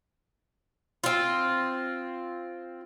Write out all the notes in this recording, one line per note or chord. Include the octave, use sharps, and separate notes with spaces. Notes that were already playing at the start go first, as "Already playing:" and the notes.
C4 F4